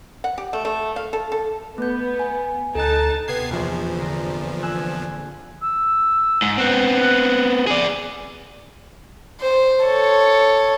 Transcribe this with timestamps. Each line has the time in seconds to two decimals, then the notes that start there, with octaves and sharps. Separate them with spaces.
0.24 F#5
0.38 G4
0.53 A3
0.65 A3
0.96 F5
1.13 A4
1.32 A4
1.78 A3 B3 G6
2.19 G#5
2.75 D2 D#4 A4 A5 F#6
3.28 C3 B3 G#6 C7
3.51 F1 A#1 E2 F3
3.96 D3 A#5
4.62 G#5 E6 F#6
5.61 E6
6.42 G#2 F#5
6.58 B3 C4 F#6
7.67 G#4 D5 G#5
9.40 C5
9.84 A4 C#5